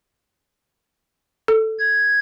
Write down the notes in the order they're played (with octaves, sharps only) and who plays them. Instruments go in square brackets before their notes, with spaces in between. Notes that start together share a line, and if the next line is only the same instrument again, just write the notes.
[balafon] A4
[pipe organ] G#6